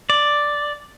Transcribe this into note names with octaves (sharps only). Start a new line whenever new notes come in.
D5